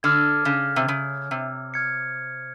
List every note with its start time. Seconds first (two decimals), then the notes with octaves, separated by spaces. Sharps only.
0.03 D3 D6 F6 G#6
0.45 C#3
0.76 C3
0.88 C#3
1.31 C3
1.74 F6 G#6 C#7